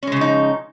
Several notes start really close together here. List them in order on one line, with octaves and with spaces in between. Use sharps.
C#4 G#3 C#3 F3 D#4